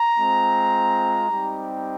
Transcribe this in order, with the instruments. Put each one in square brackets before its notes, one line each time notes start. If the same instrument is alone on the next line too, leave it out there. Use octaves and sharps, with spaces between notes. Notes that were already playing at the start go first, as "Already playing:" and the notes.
Already playing: [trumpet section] A#5
G#3 C4 F4
G3 C4 D#4 G4